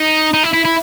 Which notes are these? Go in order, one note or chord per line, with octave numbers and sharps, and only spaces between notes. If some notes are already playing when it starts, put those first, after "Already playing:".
Already playing: D#4
D#4
E4
E4
E4